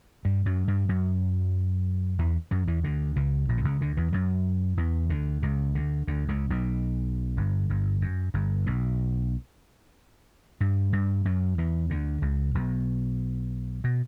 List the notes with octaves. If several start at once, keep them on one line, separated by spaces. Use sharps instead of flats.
G2 G3
F#2 F#3
G2 G3
F#2 F#3
E2 E3
F#2 F#3
E2 E3
D2 D3
C#2 C#3
A#1 A#2
D3
C#2 C#3
D2 D3
E2 E3
F#2 F#3
E2 E3
D2 D3
C#2 C#3
D2 D3
D2 D3
C#2 C#3
B1 B2
G1 G2
G1 G2
F#2
G1 G2
B1 B2
G2 G3
G2 G3
F#2 F#3
E2 E3
D2 D3
C#2 C#3
B1 B2
B2